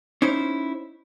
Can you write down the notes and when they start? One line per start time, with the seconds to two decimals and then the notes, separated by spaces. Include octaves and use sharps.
0.22 C#4 D#4 E4 C5